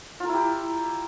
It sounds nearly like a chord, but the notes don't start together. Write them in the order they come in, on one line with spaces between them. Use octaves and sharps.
F4 A#4 E4 G4